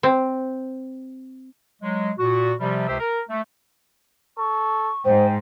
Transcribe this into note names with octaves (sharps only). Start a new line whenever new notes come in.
C4
F#3 G#3
A#2 F#4
C3 F3 G3
C#2 C3 G4 C5 E5 E6
A#4
A3
A4 C#6
G#2 C5 G5